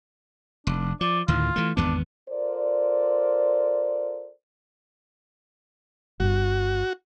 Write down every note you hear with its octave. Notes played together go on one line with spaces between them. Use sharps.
F1 D4
F3 D5
D2 A2 D#3 F4
E3 A3
G#1 E2 B3 D4
F4 A4 A#4 C5 D5
G1 G2 F#4